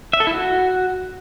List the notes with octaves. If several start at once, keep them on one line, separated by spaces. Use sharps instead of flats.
E5
A4
E4
F#4